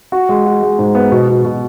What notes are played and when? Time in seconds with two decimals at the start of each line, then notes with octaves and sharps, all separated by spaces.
0.12 F#4
0.29 G#3
0.46 F#4
0.63 G#3
0.79 G#2
0.95 B3
1.12 B2
1.29 B2
1.45 B2